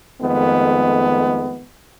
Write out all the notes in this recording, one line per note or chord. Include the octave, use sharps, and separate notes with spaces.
F2 D#3 G#3 A3 B3